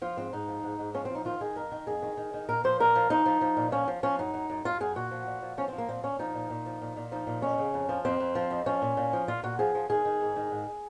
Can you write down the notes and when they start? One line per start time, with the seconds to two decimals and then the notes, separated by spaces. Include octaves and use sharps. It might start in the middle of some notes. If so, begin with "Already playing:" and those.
0.02 F3 F4
0.17 G#2 C4
0.33 G#2 D#4
0.48 F3
0.64 G#2
0.79 G#2
0.94 F3 C#4
1.05 C4
1.10 F3
1.15 D#4
1.25 D#3 F4
1.41 D#3 G#4
1.56 F2 A#4
1.72 D#3
1.87 F2 G#4
2.02 D#3
2.17 D#3
2.34 D#3
2.49 A#2 A#4
2.64 F3 C5
2.80 A#2 A#4
2.95 F3
3.10 F3 D#4
3.26 F3
3.41 F3
3.57 A#2
3.72 F3 C#4
3.88 F3
4.03 F3 C#4
4.19 F#2 D#4
4.34 F#2
4.50 F#2
4.65 F#2 F4
4.80 F#2 G#4
4.96 A#2 F#4
5.11 F3
5.27 A#2
5.42 F3
5.57 F3 C#4
5.68 C4
5.73 F3
5.78 A#3
5.89 A#2 C4
6.04 A#2 C#4
6.19 F3 D#4
6.35 A#2
6.50 A#2
6.66 F3
6.81 A#2
6.97 A#2
7.12 F3 D#4
7.27 A#2
7.42 F2 C#4
7.58 C#3
7.74 F2
7.89 F3
8.05 F2 C4
8.20 F2
8.35 F3
8.51 F2
8.66 F3 C#4
8.82 A#2
8.97 A#2
9.13 F3
9.28 A#2 F4
9.43 A#2 F#4
9.59 F3 G#4
9.75 F3
9.90 D#3 G#4
10.05 D#3
10.21 G#2
10.36 D#3
10.51 G#2